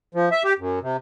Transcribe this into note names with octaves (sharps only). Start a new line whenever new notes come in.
F3
E5
G4
F#2
C3